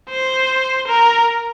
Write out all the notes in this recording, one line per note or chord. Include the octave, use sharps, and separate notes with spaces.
C5
A#4